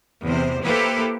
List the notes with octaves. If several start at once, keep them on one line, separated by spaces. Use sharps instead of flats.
E2 C3 C5
A#3 E4 G4 A4 B4 C5